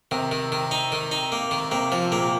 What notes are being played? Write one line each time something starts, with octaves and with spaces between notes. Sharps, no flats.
C3 D#3
D#3
D#3
D#4
D#3
D#4
A#3
D#3
C3 A#3
F3
A#2 A#3